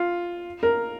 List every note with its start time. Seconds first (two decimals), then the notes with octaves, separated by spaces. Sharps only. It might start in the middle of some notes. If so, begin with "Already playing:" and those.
Already playing: F4
0.63 A#4